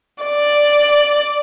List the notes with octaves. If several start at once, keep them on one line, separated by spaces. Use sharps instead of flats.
D5